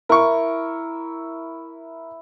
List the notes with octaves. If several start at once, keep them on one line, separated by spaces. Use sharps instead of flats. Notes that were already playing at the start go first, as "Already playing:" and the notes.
E4 A#4 C#6